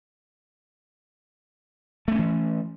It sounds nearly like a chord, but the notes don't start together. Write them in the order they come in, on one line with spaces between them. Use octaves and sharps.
A3 C4 C#4 E3